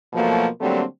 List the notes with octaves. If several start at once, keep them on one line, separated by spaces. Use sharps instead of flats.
B2 F3 F#3 A3 A#3
D3 F#3 G3 A3 A#3 C4